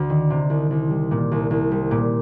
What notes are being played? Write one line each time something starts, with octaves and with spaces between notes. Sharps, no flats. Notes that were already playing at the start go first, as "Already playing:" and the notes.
Already playing: D2
D#3
C3
C2
C2
G3
A#2
C2
C2
G3
A#2